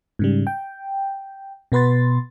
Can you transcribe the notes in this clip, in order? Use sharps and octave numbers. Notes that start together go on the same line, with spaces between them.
G#2 C#3 G3
G5
B2 B3 B4 C6 A6